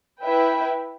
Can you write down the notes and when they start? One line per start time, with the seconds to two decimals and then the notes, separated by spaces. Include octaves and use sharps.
0.23 E4 B4 E5 G5